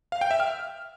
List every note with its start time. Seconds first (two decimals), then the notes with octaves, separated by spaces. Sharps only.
0.12 F5
0.21 G5
0.31 E5
0.40 F6